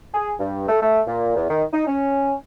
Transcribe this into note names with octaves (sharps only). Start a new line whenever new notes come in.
G#4
G2
A3
A3
A#2
E2
D#3
D#4
C#4